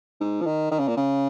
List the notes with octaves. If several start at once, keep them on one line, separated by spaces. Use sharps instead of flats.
G#2
F3
D#3
D#3
C#3
A#2
C#3